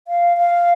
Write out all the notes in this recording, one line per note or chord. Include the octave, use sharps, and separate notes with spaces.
F5
F5